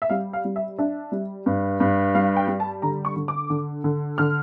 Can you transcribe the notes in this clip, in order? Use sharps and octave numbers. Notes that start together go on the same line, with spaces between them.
E5
G3 F5
F5
G3
E5
D4 E5
G3
G2
G2
G3 F5
G5
G3
A5
D3 A#5
C#6
D3
D6
D3
D3
D3 F6